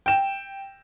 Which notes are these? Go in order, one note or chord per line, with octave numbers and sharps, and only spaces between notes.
G5 E7